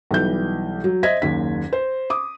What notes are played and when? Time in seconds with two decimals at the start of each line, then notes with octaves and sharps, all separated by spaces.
0.11 B1 E3 G3 G6
0.84 F#3
1.03 C5 D#5 E5 G#6 A#6 B6
1.22 F#1 D#2 B6
1.73 C5
2.10 D6 D#6